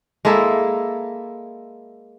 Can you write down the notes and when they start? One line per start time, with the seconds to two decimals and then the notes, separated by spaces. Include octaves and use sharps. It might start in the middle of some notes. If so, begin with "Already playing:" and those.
0.25 G#3 A#3 E4 A4